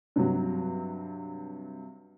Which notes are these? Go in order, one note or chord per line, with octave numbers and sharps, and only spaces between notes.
G2 C3 F#3